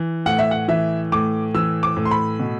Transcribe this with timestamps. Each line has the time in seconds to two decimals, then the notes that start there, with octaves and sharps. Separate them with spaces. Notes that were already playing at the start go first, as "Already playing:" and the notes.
Already playing: E3
0.26 A2 F#5
0.39 E5
0.51 F#5
0.68 E3 E5
1.12 A2 D6
1.54 E3 E6
1.83 D6
1.97 A2
2.05 C6
2.11 B5
2.40 B2